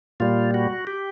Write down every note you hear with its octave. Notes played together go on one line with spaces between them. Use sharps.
A#2 G3 F4
F#4
G4